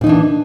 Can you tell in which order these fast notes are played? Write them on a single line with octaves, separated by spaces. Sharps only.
A#2 D#4 E3 D4